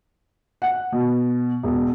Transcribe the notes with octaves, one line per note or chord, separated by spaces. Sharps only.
F#5
B2
E1